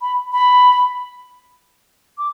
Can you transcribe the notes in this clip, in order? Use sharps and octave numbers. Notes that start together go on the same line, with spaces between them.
B5
B5
D6